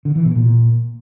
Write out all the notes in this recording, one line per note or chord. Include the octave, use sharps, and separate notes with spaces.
D3
E3
B2
A#2